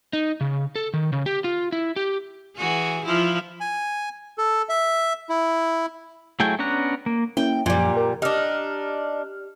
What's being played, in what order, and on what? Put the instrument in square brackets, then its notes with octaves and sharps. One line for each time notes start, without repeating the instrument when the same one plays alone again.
[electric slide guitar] D#4
C#3
A4
D#3
C#3
G4
F4
E4
G4
[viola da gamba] E3 F#4 G#4
F3 E4 F4
[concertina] G#5
A4
E5
E4
[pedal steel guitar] F#3 A3 E4 G#4 G5
B3 C#4 D4 A#5 F#6
A#3
[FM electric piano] A#3 C#4 E4 [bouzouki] G5
[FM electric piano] F#2 F3 [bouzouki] A#2 G3
[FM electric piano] A#4
[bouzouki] D4 D#4 [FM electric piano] G4 F6